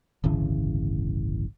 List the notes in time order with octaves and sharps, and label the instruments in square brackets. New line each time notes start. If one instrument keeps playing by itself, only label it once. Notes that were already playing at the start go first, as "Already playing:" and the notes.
[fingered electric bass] D1 G1 C#3 E3